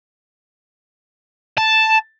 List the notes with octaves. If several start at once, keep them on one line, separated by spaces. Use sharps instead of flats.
A5